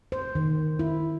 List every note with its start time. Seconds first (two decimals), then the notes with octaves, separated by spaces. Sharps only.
0.12 C5
0.35 D#3
0.79 E4